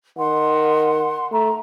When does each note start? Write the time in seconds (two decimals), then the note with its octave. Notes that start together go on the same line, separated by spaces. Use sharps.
0.17 D#3 F#5 C6
1.31 A3 A#5